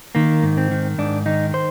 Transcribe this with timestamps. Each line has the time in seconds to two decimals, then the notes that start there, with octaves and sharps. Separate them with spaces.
0.15 D#3 A#3
0.43 G#2
0.58 C4
0.71 D#3
0.98 G#2 D4
1.26 D#3 D#4
1.54 C5